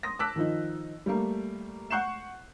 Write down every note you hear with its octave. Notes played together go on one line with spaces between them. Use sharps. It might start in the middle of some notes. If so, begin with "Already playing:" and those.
C6 D#6 A#6
A5 D6 E6 F#6 B6
D#3 F3 D#4
G3 A3 A#3
F#5 C#6 F#6 G6 C7 E7